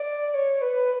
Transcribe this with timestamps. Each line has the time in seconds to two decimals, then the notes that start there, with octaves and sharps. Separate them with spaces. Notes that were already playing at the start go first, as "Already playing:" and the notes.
Already playing: D5
0.34 C#5
0.61 B4